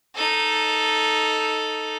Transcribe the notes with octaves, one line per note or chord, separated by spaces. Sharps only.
D#4 A4